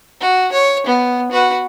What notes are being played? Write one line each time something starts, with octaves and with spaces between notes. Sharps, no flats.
F#4
C#5
B3
F#4 B4